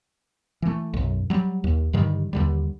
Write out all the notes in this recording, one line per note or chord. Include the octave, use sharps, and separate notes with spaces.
E3 A3
B1 F#2
F#3 G3
D#2
G2 D3 D#3 G3
D#2 D3 G3